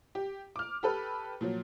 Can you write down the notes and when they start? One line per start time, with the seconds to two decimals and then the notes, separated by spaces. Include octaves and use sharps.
0.15 G4
0.56 D6 F6
0.83 G4 A4 B4
1.41 A#2 F3 F#3